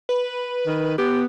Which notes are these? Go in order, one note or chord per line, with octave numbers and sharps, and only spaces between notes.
B4
D#3
B3 G4